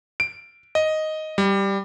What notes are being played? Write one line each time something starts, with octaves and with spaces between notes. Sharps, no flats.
D7
D#5
G3